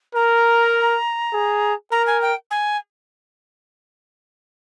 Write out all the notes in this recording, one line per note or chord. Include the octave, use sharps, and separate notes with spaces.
A#4 A#5
G#4
A#4 A#5
G#5
G5
G#5